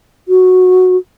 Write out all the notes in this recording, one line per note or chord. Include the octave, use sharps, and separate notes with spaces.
F#4